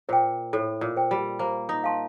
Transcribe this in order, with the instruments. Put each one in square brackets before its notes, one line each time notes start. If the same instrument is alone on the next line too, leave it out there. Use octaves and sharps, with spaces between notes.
[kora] A#2 [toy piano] C5 G5
[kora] A2 [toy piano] A4
[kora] A#2
[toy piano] C5 G5
[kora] G3
[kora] A#3 [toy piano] C5
[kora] D#4
[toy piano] F5 A5 C6